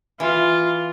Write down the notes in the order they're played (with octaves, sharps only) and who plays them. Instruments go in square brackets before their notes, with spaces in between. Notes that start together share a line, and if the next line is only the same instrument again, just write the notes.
[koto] E3 [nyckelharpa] F4